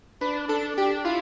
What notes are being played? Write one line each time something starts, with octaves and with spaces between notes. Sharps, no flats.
D4 B4
D4 A4
D4 G4
E4 F4